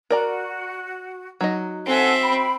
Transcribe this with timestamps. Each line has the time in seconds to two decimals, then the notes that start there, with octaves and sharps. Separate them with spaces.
0.11 F#4 A#4 D5 A#5
1.41 F#3 D#4 D#5
1.86 C4 A4 E5 F#5 G#5
2.21 G5 B5 C6